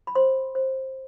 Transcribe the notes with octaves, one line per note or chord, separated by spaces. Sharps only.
B5
C5 C6
C5